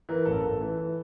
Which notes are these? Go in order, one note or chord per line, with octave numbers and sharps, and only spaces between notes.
E3 A#4
A1 A4
A#4
A1 A4
E3
E3